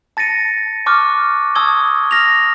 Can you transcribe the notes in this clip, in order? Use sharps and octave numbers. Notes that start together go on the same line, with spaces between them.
A5 A6 A#6 C#7 D#7
A5 C#6 D6 F6 F#6
A5 C#6 D#6 E6 G#6 G7
F6 A#6 F7